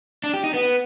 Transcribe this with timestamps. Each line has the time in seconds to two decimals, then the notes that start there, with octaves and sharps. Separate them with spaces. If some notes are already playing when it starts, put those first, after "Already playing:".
0.24 D4
0.34 G4
0.44 D#4
0.54 B3